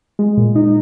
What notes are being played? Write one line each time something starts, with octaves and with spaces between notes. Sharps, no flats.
G#3
A#2
D#4